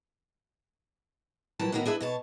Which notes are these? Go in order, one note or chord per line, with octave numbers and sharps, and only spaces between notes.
A#2 E3 F#3 G3 A5
A2 D#3 A#3 B3 F#4
D4 G#4 B4 E5
B2 C#5 A5